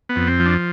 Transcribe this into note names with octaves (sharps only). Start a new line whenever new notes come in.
B3
F2
C4
F3
D4